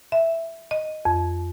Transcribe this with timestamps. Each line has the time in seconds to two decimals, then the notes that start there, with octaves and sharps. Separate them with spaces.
0.12 E5
0.71 D#5
1.05 F2